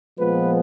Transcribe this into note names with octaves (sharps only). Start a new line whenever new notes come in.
A#2 F3 G#3 B3 B4